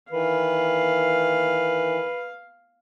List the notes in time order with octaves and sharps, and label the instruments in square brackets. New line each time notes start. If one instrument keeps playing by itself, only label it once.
[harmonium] D#3 E3 [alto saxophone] B4 [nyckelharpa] F5